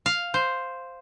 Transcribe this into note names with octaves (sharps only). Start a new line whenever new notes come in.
F5
C5